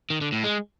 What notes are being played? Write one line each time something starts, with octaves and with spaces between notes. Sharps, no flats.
D#3
D3
A2
G#3